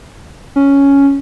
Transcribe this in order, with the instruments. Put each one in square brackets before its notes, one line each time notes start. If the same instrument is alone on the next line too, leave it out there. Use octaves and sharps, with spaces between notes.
[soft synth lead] C#4